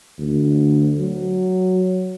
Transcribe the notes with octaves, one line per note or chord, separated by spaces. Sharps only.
D2
F#3